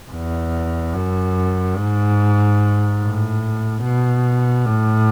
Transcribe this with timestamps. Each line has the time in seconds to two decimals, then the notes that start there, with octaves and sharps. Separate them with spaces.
0.12 E2
0.94 F#2
1.77 G#2
3.00 A2
3.83 B2
4.65 A2